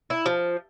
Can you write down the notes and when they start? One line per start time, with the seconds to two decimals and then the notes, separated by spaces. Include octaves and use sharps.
0.10 E4
0.26 F3